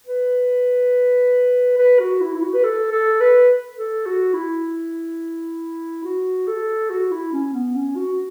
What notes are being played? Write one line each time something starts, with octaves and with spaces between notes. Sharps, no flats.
B4
B4
F#4
E4
E4
F#4
B4
A4
A4
B4
A4
F#4
E4
F#4
A4
F#4
E4
C#4
B3
C#4
F#4